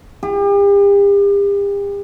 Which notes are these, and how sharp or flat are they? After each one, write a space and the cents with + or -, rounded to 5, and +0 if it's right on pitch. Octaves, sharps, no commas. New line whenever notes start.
G4 +40